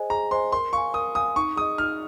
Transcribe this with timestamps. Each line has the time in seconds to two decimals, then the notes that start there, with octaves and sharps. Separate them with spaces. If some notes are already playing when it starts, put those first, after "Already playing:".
Already playing: G#4 C5 D#5 G#5
0.10 G#4 A#5
0.31 C5 D#5 G#5 C6
0.52 A#4 C6
0.73 F5 G#5 C#6
0.94 A#4 D#6
1.15 F5 G#5 D#6
1.36 D#4 C#6
1.56 G#4 D#5 D#6
1.78 D#4 F6